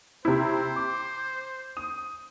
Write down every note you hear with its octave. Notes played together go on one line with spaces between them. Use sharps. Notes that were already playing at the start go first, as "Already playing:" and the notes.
C3 E4 C5
D6
D#6